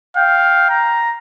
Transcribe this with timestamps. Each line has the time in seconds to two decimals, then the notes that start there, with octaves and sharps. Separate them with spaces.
0.16 F5 G5
0.70 A#5